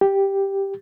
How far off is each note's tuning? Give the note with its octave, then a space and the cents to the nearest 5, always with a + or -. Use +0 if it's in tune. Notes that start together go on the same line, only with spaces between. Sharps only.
G4 +0